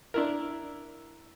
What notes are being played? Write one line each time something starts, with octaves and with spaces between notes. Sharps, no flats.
D4 E4 A#4